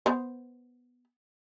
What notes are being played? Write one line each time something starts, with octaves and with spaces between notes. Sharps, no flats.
B3 C5